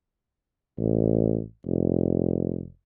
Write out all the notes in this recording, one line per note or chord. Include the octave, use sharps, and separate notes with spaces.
A1
F1